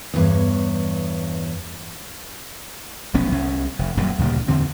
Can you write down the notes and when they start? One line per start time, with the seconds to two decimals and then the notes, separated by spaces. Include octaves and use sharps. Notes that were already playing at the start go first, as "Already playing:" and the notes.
0.14 E2 G2 C#5
3.14 F1 B1 B3 C#4
3.32 C2 C#4
3.79 F1
3.97 D#1 F#2 A#2 G3
4.19 D2 A#2 C#3 G3
4.48 E2 D3 C4